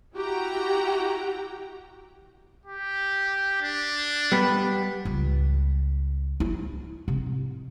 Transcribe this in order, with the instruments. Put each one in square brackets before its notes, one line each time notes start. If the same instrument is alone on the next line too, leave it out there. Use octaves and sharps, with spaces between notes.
[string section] E4 F#4 G4 G5 A#5
[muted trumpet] G4
D4
[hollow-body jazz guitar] G3 B3
[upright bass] C#2
E4
C3